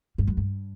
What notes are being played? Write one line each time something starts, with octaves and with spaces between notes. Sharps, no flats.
G2
F#2
G2